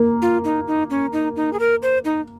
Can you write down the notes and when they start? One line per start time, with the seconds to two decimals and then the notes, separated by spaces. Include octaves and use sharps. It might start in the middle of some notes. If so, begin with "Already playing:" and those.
Already playing: A#3
0.22 F4
0.44 D#4
0.67 D#4
0.90 C#4
1.13 D#4
1.36 D#4
1.53 G#4
1.60 A#4
1.82 C5
2.05 D#4